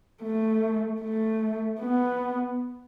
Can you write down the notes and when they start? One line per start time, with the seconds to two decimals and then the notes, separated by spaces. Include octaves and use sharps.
0.23 A3
1.02 A3
1.80 B3